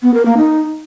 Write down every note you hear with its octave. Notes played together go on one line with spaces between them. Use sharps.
B3
A#4
A#3
D#4